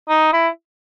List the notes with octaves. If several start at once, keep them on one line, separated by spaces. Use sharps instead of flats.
D#4
E4